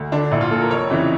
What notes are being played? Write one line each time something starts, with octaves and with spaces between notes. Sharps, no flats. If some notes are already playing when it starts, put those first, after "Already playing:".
Already playing: D2
D3 D4
A#1 E4
F4
A#2 A4
A#4
F1 C#5
F2 C#3 E3